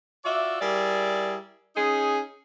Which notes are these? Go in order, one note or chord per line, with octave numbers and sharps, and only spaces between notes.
F4 F#4 D5 E5
G3 E4 G#4 A#4 D5
C#4 D#4 G#4